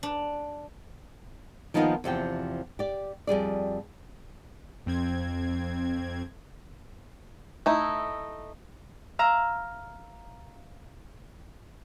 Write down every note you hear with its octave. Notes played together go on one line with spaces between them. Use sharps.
D4
D#3 F3 A#3 B3 D#4 F4
E2 C3 F3 G5
G4 D5
F2 G3 G#4 D5
F2 C4 G#6
A3 D#4 E4
F5 A#5 E6